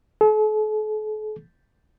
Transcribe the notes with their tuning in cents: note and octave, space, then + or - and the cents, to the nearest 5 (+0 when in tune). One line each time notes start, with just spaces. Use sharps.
A4 -45